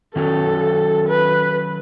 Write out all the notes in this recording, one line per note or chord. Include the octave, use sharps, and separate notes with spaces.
D#3 F#3 C#4 F#4 A4
B4